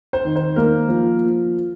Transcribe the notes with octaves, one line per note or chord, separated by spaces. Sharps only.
C5
D#3
C5
A#3 A#4
F3